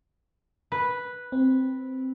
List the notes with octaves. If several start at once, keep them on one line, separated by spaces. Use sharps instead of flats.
B4
C4